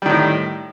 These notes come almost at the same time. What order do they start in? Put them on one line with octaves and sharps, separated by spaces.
G3 D#3 A2